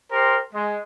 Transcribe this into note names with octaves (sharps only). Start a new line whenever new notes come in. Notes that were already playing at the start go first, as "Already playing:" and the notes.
G4 A#4 C5 C6
G#3